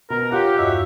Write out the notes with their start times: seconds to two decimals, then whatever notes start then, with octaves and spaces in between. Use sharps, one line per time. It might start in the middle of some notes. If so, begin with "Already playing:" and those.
0.10 B2 A#4 F#5 A#5
0.32 F4 G4 C#5 F#5
0.58 E2 G2 D#4 F#4 C#5 E5